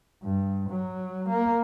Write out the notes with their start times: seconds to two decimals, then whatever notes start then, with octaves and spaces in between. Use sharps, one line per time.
0.23 G2
0.69 F#3
1.29 A#3